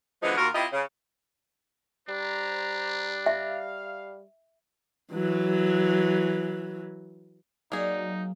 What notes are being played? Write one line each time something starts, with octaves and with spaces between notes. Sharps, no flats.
D3 E3 F3 G#3 B3 D#4
D#2 F4 F#4 A#4
C4 E4 F4 G4 D#5
C#3
G3 D4 C5 A#5
E5 F5
E3 F#3
F#3 A#3 D#4 G4 G#4 D5 F#5